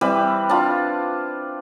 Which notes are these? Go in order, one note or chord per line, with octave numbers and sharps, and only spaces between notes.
E3 G3 C4 B4
D4 F4